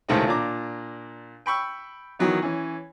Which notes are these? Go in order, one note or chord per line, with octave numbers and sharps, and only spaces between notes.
C#2 A2 C3 D#3 A3 C4
A#2 D4 A#5 D6
G5 B5 C#6 E6
D#3 E3 F#3 B3
E3 C#4